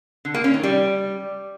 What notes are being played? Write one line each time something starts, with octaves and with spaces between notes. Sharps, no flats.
D3
A#3
C#4
D#3
G3